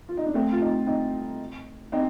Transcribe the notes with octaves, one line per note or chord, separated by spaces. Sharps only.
F4
D#4
D4
A3 C4
F4
C4 D#4
C4 D#4
C4 D#4